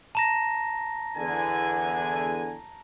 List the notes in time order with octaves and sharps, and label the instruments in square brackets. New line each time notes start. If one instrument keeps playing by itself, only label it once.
[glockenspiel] A5 A#5 A#6
[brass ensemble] E2 D3 G#5